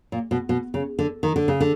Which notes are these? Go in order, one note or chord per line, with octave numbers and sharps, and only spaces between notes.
A#2
B2
B2
C#3
D3
D#3
D3
C#3
D3